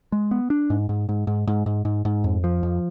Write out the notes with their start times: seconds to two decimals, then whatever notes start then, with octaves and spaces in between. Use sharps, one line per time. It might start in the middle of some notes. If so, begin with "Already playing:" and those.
0.12 G#3
0.31 B3
0.50 D4
0.70 G#2
0.89 G#2
1.09 G#2
1.27 G#2
1.47 G#2
1.66 G#2
1.85 G#2
2.05 G#2
2.24 F2
2.44 F3
2.63 F2